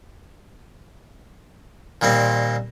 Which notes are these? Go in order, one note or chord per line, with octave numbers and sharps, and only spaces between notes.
A#2 D#3 G3 A#3 C4